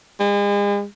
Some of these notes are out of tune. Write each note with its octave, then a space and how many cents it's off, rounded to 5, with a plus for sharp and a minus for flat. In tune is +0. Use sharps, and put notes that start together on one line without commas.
G#3 -40